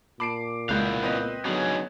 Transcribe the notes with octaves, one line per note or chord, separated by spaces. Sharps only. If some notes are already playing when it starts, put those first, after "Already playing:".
A#2 A5 B5 D6 C7 D7
C2 C#3 G#3 B3 E4 F5 F#6 G6
C4 B4 D#5
D3 F#3 B3 C#4 D#4 G#4